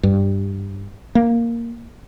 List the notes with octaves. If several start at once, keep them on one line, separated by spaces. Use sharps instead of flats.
G2
A#3